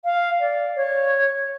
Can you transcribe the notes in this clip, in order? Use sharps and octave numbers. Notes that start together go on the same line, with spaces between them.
F5
D5
C#5